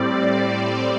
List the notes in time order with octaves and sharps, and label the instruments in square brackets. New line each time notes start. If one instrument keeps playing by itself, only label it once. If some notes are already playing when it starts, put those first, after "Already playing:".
Already playing: [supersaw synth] A2 G3 C4 D5